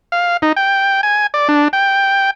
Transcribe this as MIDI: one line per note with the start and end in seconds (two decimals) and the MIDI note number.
0.12 0.37 77
0.42 0.52 63
0.57 1.01 79
1.03 1.27 80
1.34 1.48 74
1.49 1.68 62
1.73 2.31 79